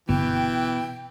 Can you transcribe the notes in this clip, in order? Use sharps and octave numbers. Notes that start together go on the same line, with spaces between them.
G1 B2 E3 G5